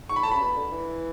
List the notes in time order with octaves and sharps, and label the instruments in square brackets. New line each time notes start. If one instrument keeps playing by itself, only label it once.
[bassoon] G#2 [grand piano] C#6
[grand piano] B5
[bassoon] A2 [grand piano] A5
[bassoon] C#3 [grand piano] B5
[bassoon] B2
D3
E3